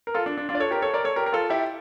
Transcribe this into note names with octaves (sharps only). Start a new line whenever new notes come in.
A#4
F4 A4
D4
D4
D4 F4
D5
A4 C#5
G4 A#4
A4 C#5
A#4 D5
A4 C#5
G4 A#4
A#4
F4 A4
E4 G4